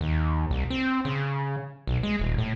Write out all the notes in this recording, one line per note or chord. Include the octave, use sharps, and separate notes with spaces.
D#2
C2
C4
C#3
B1
G#3
D#1
A2